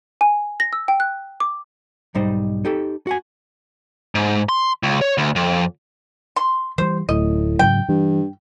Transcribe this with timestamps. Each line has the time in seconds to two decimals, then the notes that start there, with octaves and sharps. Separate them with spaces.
0.21 G#5
0.60 A#6
0.73 E6
0.88 G5
1.00 F#6
1.40 D6
2.15 B1 G#2 G3 D#4 C5
2.65 D#4 G4 A4
3.07 F#4 F#5 G#5
4.15 G#2
4.49 C6
4.83 C#2
5.01 C#5
5.18 D2
5.36 F2
6.36 C6
6.78 E3 G3 C5
7.09 D1 A2 D#5
7.59 G#2 C#3 F#3 G5
7.89 G2 E3